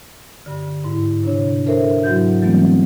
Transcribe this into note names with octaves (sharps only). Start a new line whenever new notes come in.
G2 D3
G#2 E4
C3 D4 C#5
D4 A4 A#4 C5 E5
G#2 F#3 E4 F#4 G6
E3 F#3 G3 A3 B3 C4